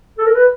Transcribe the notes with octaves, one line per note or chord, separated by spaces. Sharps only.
A4
A#4
B4